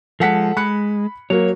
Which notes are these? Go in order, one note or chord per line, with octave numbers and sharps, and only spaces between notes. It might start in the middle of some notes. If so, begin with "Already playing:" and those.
F3 G#3 A4 F#5 B6
G#3 B5 F#6 C#7
F#3 A#3 C#5